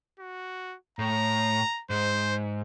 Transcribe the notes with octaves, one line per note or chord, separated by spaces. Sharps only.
F#4
A2 A#5
G#2 C5